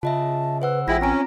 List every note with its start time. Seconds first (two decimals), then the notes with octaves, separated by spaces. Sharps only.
0.03 C#3 F4 D#5 E5 A5
0.62 B4 C5 F#5 E6
0.88 A1 G#3 E4 F4 G5 A#6
1.01 C4 C#4 A#5 D7